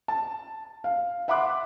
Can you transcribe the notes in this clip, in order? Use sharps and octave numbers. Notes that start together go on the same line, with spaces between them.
A5
F5
E5 F#5 B5 C6 D6 F#6